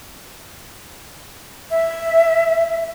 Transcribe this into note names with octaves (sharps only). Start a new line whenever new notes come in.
E5